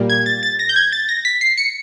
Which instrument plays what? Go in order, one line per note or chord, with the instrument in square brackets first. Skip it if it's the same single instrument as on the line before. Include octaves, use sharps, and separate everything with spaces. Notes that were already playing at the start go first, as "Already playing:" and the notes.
Already playing: [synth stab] A#2 G3 A#3
G#6
A6
A6
A#6
G6
G#6
A6
A#6
B6
C7
C#7